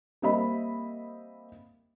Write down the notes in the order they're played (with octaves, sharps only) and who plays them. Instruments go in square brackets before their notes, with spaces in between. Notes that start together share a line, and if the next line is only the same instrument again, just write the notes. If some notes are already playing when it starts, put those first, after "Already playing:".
[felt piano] G3 A#3 C4 D#5 E5 B5